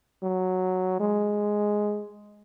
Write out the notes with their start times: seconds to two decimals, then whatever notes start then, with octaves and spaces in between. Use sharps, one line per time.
0.23 F#3
1.00 G#3